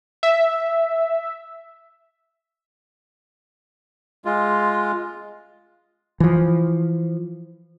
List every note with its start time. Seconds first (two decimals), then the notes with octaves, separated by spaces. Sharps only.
0.23 E5
4.25 G#3 F4
6.20 E3 F3